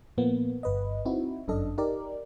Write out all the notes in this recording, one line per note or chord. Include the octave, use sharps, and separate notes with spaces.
A#2 F3 A#3 B3
G1 B4 D#5
C4 D#4 E4 F#4
G1 F#2 D4 A4 D#5
D#4 G4 A#4 D5